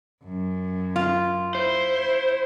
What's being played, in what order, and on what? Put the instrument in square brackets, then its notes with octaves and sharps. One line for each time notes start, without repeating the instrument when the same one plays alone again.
[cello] F#2
[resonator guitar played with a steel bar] F4
[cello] E4 [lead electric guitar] C5